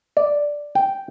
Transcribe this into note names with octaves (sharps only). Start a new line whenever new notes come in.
D5
G5